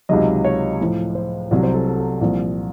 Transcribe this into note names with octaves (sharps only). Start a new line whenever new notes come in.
C#2 C3 D#3 F#3 D#5
C#5
A2 F3
C5
C2 C3 F#3
C5
A4
A4
A4
C2 A#2 F3